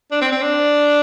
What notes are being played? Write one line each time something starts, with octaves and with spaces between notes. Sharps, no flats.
D4
C4
C4
D4